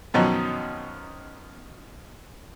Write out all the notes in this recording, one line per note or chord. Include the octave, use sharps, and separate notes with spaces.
F#2 B2 D#3 F3 F#3 D#4